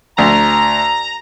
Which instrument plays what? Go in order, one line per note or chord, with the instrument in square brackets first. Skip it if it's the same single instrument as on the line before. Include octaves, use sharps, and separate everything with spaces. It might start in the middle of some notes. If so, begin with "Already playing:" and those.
[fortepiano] D2 [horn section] A#5